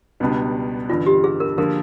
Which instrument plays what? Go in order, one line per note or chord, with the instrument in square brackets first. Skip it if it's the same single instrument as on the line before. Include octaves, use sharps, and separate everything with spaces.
[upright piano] C#2 B2 G3 B3 D4
[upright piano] A1 G2 D3 [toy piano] F4
[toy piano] G4
G#4
A#4
[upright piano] D3 F3 A#3 [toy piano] A#4